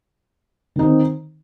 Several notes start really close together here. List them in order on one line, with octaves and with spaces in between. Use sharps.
D#3 D#4 C4